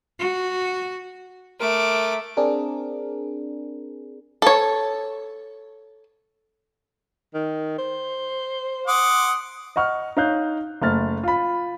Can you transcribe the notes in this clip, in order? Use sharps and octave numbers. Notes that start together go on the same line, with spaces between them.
F#4
A3 A#4 D6
C4 D4 G#4 A#4
A4 C#5
D#3
C5
F#5 C6 D6 D#6
D#5 F#5 C#6 F6
D#4 C#5 F5 F#6 G6
F#1 A3 F6 A6
F4 B5